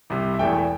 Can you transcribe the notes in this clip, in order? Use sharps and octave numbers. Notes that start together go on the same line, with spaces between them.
C2 C3 G3
E5
E1 E2 E3 A3 G5